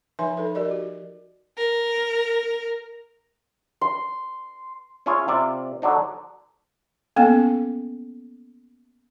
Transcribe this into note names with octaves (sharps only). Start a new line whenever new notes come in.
F3 D#4 B4 E5 G#5 C6
D#4 A4 B4
G4 A#4 D5 D#5
F#4
A#4
C6
C#4 E4 F4 G#4 C#5 G#5
C3 F4 D5 E5
D3 F#3 D4 D#4
A#3 B3 C#4 A4